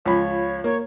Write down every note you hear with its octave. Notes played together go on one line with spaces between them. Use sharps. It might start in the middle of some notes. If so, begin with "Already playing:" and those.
C#2 F3 C#5 B5
A#3 C#5